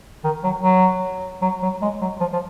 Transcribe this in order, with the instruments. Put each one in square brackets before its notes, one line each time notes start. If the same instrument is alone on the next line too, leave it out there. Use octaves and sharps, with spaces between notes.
[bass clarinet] D#3
F#3
F#3
F#3
F#3
G#3
F#3
F3
F3